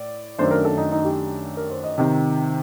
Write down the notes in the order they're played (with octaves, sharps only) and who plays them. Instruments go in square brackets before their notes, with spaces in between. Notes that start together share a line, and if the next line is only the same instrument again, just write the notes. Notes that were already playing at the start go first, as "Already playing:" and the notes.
Already playing: [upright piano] A2 [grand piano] D5
[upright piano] F#2 D#3 A3 D4 [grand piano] C5
[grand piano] A#4
A4
D#4
D#4
G4
A#4
C5
D#5
[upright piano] C3 D#3